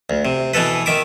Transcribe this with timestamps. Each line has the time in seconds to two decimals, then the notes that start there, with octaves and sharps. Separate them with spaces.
0.10 D2
0.25 C3
0.54 B2 E3 A4 B4
0.86 D#3 E5 D6